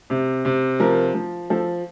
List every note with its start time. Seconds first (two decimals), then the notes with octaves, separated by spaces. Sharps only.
0.10 C3
0.45 C3
0.80 F3 A#4
1.14 F3
1.50 F3 A4